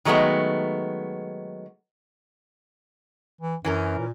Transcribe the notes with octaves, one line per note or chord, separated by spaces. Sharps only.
D#3 F#3 G#3 A3 B3
E3
F#2 E3 C#4 A#4
A#2